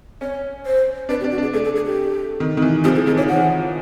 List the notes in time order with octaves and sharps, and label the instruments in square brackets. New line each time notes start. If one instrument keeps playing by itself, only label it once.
[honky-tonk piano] C#4 [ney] C#5
[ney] C5
[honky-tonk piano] D4 [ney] B4
[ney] G4
[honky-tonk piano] D4
[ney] F#4
[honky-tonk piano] D4 [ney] G#4
[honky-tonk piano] A3 [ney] G#4
[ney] A4
G#4
G4
[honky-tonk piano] D#3
D#3
E3
[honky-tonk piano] F3 [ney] G4
[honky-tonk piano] E3 [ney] G#4
[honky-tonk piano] D#3 [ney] G#4
[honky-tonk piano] E3 [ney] C#5
[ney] F#5